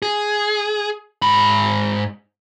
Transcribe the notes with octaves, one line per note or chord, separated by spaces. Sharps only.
G#4
G#2 B5